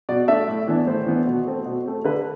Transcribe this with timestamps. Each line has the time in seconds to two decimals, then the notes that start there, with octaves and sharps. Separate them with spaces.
0.09 B2 D5
0.28 A3 D4 E5
0.48 A2
0.68 E3 B3 D4
0.87 A2 C5
1.06 E3 B3 D4
1.27 B2
1.47 A3 C4
1.66 B2
1.86 A3 C4
2.04 D3 B4